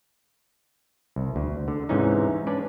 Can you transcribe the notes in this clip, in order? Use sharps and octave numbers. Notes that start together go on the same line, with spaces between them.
C2
D2
D3
G#2 C3 E3 C#4 D#4
C#4 D4 B4 D5